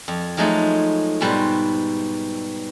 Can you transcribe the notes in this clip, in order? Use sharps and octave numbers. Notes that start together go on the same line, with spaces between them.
F2
F3 F#3 G#3 A3 D#4
G#2 B2 G3 B4 C5